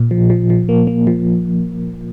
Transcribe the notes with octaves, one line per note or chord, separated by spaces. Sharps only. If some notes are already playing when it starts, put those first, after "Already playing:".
Already playing: A#2
F3
F3
F3
A#3
A#3
F3